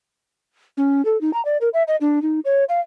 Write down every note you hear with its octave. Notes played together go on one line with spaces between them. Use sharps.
C#4
A4
D#4
A#5
D5
A#4
E5
D#5
D4
D#4
C#5
F5